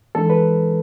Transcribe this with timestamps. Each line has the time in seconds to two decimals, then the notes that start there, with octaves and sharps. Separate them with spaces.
0.15 E3 G#3 D4 A4
0.30 B4